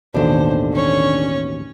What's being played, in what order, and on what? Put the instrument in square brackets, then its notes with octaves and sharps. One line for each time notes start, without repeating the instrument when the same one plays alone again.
[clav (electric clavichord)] A1 D#2 B2 [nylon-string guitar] D3 D4 [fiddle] C5
[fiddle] C#4 C#5